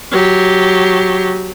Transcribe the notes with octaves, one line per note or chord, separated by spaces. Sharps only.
F#3 G4